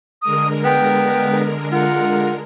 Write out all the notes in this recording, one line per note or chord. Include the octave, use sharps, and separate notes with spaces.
D3 G#3 A#4 D#6
B3 G5
F4 F#5